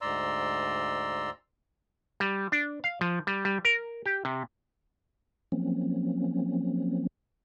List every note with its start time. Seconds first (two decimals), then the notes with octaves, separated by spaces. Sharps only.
0.01 D2 G#2 D5 A#5 C6 E6
2.20 G3
2.52 D4
2.84 F5
3.01 F3
3.27 G3
3.45 G3
3.65 A#4
4.06 G4
4.25 C3
5.52 F3 F#3 A#3 C4 C#4